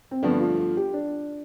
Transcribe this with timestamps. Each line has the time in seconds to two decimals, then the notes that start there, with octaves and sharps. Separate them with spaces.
0.11 C4
0.23 G2 D3 F3 A3 B3 D4
0.40 F4
0.58 F4
0.77 G4
0.93 D4